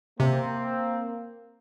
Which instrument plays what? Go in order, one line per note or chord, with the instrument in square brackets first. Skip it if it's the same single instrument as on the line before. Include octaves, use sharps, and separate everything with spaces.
[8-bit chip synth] C3 [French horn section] A#3 [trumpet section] C4